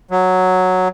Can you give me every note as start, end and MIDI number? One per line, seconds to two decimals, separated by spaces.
0.11 0.88 54